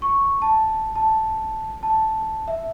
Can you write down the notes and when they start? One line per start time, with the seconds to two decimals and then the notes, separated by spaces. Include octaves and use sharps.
0.02 C#6
0.42 A5
0.96 A5
1.83 A5
2.48 E5